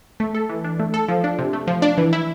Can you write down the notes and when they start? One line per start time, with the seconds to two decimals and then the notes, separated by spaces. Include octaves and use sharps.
0.20 A3
0.35 A4
0.49 E3
0.64 D4
0.80 A3
0.94 A4
1.08 F3
1.24 D4
1.39 C3
1.53 A3
1.67 F3
1.82 D4
1.98 E3
2.13 E4